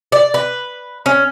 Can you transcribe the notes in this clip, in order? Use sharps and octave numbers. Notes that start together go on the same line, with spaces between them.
D5
B4
C#4